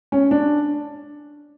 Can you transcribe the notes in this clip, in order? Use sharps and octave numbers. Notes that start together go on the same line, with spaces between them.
C#4
D4